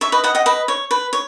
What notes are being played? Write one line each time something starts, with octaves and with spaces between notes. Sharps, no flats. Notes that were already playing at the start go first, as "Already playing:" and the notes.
C#5 E5
B4 D#5
D#5 F#5
D#5 F#5
B4 D#5
C#5
B4
C#5